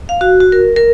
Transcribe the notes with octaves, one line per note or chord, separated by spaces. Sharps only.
F5
F#4
F#4
A#4
A#4